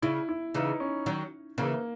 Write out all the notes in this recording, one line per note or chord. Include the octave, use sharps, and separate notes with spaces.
C#3 E4
E4
C#3 E3 D#4
C#4
D#3 F#3
C#3 E3 A#3